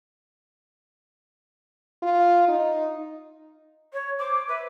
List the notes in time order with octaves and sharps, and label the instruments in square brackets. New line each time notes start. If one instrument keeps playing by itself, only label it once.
[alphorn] F4
D#4
[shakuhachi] C#5
[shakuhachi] C5 [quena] D6
[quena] B4 [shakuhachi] E5